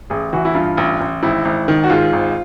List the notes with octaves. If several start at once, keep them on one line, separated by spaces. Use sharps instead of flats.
A1 G#4
E3 F#4
E4
G2 F4
A1
A1
G#1 E4
G#1
D#3
F#4
G#2 F4
G#1